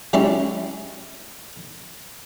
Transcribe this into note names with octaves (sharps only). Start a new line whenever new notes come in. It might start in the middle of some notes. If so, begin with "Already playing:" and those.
F#3 G#3 C#4 E4 G4 D5